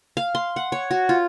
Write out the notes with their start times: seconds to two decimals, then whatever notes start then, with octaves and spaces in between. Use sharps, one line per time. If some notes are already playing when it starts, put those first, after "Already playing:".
0.17 F5
0.35 C6
0.56 F#5
0.72 C#5
0.91 F#4
1.09 F4